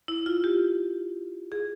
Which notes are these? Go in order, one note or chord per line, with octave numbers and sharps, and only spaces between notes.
E4
F4
G4
G#4